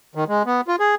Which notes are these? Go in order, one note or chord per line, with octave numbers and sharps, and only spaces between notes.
D#3
G#3
B3
F4
G#4